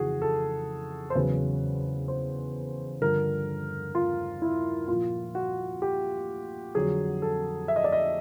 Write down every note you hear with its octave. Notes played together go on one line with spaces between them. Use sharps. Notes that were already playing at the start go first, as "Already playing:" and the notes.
Already playing: F2 C#3 E3 F#4 G#4
A4
C5
E2 C#3 F#3 B4
C5
G2 D3 F3 A#4
F4
E4
A#2 F3 F4
F#4
G4
F2 D3 F#3 G#4
A4
E5
D#5
D5
D#5